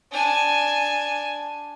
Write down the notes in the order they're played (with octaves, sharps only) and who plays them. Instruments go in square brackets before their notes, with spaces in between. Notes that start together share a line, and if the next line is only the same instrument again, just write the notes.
[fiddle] D4 G#5